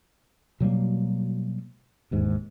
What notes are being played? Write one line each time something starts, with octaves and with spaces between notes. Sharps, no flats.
B2 F#3 G3 A#3
E1 D#2 G#2